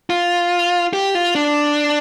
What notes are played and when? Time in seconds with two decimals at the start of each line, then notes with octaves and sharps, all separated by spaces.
0.10 F4
0.93 G4
1.15 F4
1.35 D4